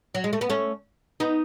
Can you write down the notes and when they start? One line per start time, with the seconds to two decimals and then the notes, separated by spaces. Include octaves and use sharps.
0.15 F#3
0.24 G#3
0.33 A3
0.41 B3
0.50 A3 C#4
1.20 B3 D#4